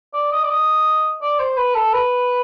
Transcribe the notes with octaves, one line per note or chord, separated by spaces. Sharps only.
D5
D#5
D5
D#5
D5
C5
B4
A4
B4